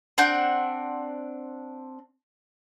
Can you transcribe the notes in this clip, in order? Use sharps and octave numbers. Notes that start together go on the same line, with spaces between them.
C4 D4 F#5 G6